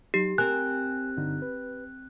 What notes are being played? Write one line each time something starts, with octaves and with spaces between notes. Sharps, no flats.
F#3 D#4 G4
C4 A#4 G#5 F#6
G2 D3 D#4
B4